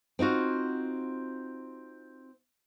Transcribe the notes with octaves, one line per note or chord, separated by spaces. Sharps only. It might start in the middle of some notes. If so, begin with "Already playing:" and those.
C4 D#4 F4 F#4